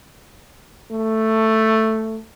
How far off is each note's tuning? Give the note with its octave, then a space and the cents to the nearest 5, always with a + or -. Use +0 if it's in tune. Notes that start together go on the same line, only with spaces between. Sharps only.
A3 +5